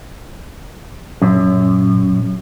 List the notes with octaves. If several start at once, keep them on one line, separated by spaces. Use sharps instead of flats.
F#2 A#2